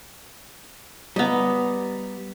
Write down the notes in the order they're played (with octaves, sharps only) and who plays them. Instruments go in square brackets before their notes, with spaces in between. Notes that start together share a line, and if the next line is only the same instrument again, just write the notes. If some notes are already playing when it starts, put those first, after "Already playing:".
[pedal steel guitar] G3 A#5 [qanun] B3 D#5